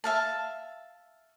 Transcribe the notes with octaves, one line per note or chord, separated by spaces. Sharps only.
E5 F5 A5